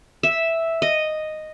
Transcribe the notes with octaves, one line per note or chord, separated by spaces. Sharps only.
E5
D#5